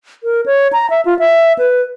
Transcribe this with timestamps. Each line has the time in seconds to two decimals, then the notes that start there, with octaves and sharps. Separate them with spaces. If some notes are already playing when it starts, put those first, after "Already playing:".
0.24 A#4
0.46 C#5
0.73 A#5
0.90 E5
1.05 F4
1.19 E5
1.59 B4